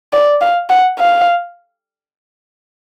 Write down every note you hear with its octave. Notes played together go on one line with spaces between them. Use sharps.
D5
F5
F#5
F5